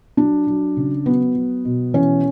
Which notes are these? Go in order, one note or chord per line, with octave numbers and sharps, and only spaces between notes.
F#3 D4
F#3
C#3
F#3 B3
F#3
B2
E3 C#4